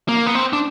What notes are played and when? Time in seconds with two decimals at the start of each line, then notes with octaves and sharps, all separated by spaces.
0.09 A#3
0.26 B3
0.35 C4
0.53 D4